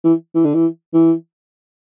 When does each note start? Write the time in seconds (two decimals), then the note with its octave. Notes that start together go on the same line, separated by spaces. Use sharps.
0.04 E3
0.35 E3
0.45 D3
0.54 E3
0.94 E3